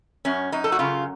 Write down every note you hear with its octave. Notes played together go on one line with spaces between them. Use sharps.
F#2 C#4
F#2 D#4
A4
F#4
C#3 F4